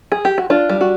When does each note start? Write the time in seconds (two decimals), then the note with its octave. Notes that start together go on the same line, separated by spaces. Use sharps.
0.12 G#4
0.25 G4
0.38 F#4
0.50 D4 F4
0.69 G3
0.81 F#4